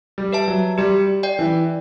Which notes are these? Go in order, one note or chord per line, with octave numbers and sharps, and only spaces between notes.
G3
B4 E5 A5
F#3
G3 G4
D5 G5
E3